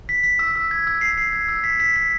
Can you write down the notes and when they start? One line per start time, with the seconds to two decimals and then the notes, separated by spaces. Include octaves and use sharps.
0.09 B6
0.24 B6
0.39 E6
0.56 E6
0.71 G#6
0.87 E6
1.01 C7
1.17 C7
1.33 G#6
1.48 E6
1.64 B6
1.80 B6
1.96 B6